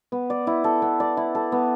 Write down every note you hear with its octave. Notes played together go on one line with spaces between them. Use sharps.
B3
D5
E4
A4
B3
D5
E4
A4
B3